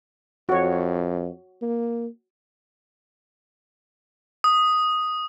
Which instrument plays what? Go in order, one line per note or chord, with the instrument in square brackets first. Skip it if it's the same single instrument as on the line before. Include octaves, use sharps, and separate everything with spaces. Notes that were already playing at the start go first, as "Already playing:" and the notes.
[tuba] F2 [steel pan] F#4 C#5
[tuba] A#3
[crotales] D#6